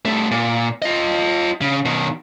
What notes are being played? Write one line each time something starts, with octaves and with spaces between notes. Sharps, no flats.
G3 A3
A#2
F4 D#5
C#3
B2 D#3